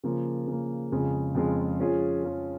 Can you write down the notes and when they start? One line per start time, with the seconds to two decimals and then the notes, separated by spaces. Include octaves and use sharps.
0.03 C#3 F3 A#3
0.47 C#3 F3 A#3
0.92 F2 C#3 G#3 F4
1.35 F2 C#3 G#3 F4
1.79 F3 C#4 F4 G#4
2.23 F3 C#4 F4 G#4